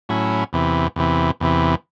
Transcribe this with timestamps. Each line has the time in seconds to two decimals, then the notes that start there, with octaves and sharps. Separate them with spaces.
0.09 A2 F#3 C#4 E4
0.53 E2 C3 E3
0.96 E2 C3 E3
1.40 E2 C3 E3